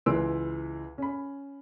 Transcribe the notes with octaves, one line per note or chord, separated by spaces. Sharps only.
C#2 E3 B4 C6 E6 D7
C#4 B5